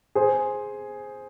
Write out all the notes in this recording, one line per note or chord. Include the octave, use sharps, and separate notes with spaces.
G#4 C5